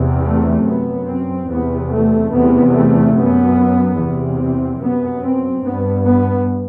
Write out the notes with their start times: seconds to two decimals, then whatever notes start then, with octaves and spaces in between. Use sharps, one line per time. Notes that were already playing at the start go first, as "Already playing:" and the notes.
Already playing: E2 C3
0.24 A3
0.65 F#2 B3
1.07 C4
1.48 E2 C3 B3
1.90 A3
2.31 E2 C3 B3
2.73 A3
3.15 F#2 B3
3.98 E2 C3
4.39 C4
4.81 F#2 B3
5.22 C4
5.63 G2 B3
6.05 B3